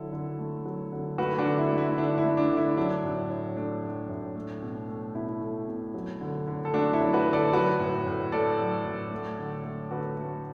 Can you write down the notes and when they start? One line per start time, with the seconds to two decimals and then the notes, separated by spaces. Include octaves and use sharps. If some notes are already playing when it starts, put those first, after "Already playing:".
Already playing: D3 F#3 E4 A4
0.13 D3
0.39 A3
0.65 F#3
0.92 D3
1.18 A3 F#4 B4
1.38 D4 F#4
1.45 D3
1.58 E4
1.71 A3
1.78 E4
1.98 D3 D4
2.18 E4
2.24 A3
2.37 D4
2.51 D3
2.57 E4
2.77 F#3 D4
3.04 A2
3.30 A2
3.56 A3 D4
3.83 F#3
4.09 A2
4.36 A3
4.62 B2
4.89 A3
5.15 B2 E4
5.41 A3
5.68 B2
5.94 F#3
6.21 D3
6.47 D3
6.65 A4
6.74 A3 D4 F#4
6.93 E4 A4
7.00 F#3
7.13 F#4 B4
7.27 D3
7.33 A4 D5
7.53 F#3 F#4 B4
7.80 A2
8.06 A2
8.32 A3 A4 D5
8.59 F#3
8.85 A2
9.11 A3
9.38 D3
9.65 A3
9.91 D3 F#4 B4
10.18 A3